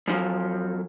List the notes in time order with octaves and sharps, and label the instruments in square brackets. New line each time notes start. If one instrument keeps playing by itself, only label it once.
[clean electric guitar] F#2 C3 D#3 F3 F#3